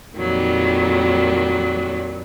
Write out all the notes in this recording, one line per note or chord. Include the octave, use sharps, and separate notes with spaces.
F2 A#2 D#3 F#3 G3